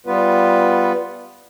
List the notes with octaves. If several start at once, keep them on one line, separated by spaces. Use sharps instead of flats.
G3 B3 F4 B4